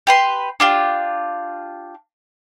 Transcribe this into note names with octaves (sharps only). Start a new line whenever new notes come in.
G4 B4 C6
D4 F4 G4